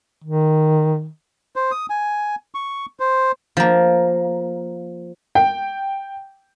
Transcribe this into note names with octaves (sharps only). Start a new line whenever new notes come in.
D#3
C5
D#6
G#5
C#6
C5
F3 A#3
G5